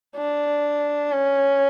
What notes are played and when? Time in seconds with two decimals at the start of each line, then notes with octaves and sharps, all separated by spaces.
0.17 D4
1.12 C#4